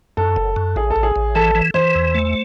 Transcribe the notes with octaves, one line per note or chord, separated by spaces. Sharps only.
F#2 A4
F#1
F#2
A1 G#4
A4
A1
G#4
A1
E3 A4
E3
E3 C5
E2
A3